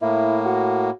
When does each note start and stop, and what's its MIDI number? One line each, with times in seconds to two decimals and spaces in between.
0.02 0.90 45
0.02 0.90 58
0.02 0.39 64
0.45 0.90 66